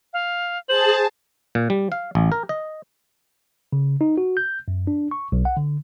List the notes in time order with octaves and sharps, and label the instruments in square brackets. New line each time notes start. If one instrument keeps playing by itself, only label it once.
[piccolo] F5
[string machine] G#4 A5 [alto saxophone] C5 [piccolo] F#7
[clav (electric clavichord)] A#2
G3
F5
A1
A#4
D#5
[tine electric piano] C#3
D#4
F#4
G6
F#2
D4
C#6
B1
F#5
D3